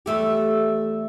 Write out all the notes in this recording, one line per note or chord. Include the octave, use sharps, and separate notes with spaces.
E2 A3 G4